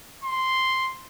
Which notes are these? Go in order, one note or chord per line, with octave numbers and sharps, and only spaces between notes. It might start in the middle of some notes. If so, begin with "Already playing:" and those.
C6